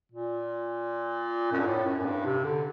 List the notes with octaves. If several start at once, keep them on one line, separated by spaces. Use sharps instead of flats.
A#2
F#2
G2
A2
F#2
F#2
G2
C3
D3